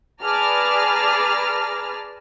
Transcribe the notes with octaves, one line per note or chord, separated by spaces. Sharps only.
G#4 B4 D5 A5 A#5 F6